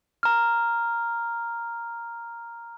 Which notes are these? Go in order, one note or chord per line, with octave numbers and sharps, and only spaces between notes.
A#5 F6